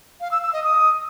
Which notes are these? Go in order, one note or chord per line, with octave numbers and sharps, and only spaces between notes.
F5
E6
E6
D#5
D#6